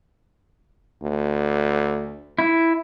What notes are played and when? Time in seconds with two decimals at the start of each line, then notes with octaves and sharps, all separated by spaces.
1.03 D2
2.39 E4